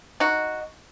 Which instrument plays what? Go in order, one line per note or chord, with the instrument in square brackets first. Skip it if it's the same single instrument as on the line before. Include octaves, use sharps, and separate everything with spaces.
[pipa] D#4 F#4